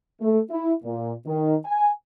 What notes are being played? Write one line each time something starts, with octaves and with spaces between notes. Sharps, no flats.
A3
E4
A#2
D#3
G#5